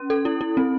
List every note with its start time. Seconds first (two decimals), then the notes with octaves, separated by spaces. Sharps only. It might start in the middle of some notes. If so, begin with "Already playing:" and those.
Already playing: C#4
0.10 A4
0.25 E4
0.41 E4
0.57 C4